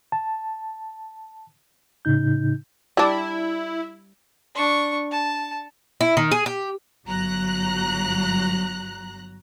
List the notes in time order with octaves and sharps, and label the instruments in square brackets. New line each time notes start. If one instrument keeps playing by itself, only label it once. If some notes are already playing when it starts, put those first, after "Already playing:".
[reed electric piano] A5
A2 C#3 D#4 G6
[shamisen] G3 D4 [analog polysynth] E4
[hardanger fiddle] D4 C#6
A5
[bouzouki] E4
D#3
G#4
G4
[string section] G1 F#3 A#5 F#6